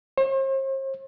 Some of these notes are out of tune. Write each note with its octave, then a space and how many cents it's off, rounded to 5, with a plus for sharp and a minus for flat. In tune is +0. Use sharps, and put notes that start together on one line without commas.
C5 +40